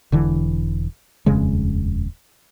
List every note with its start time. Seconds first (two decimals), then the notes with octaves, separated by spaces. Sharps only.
0.12 E1 D3 E3
1.26 D#1 F2 C#3 G#3